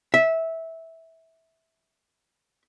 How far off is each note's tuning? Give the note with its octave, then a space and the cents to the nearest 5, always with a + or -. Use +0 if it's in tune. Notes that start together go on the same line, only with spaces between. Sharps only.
E5 -15